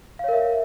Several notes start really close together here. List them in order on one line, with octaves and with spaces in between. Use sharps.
F5 C#5 A#4 E5